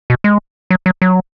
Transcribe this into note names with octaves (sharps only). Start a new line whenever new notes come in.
B2
G#3
F#3
F#3
F#3